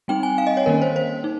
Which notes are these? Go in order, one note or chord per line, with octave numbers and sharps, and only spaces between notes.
G3 C4 D#4 G5
G#5
F5
D#5
C#5
D#3 A#3 C#4 A#4
C5
C5
D#4